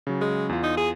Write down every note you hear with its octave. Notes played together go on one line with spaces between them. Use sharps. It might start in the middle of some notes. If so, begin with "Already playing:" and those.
C#3 F#3
G#3
E2 F4
D#4
G#4